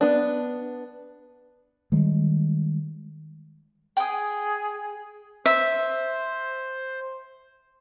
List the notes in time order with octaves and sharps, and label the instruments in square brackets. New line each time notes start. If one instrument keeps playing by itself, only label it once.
[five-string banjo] B3 D4
[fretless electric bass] D#3 G3 G#3
[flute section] G#4 [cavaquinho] G5 D#6
[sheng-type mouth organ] C5 [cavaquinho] E5